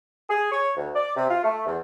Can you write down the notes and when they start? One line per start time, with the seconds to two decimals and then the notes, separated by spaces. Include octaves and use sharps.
0.29 G#4
0.52 C#5
0.76 D2
0.95 D5
1.16 C3
1.30 F4
1.44 A3
1.66 E2